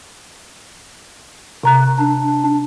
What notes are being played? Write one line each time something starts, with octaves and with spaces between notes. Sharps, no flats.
C3 A#5 F#6
D4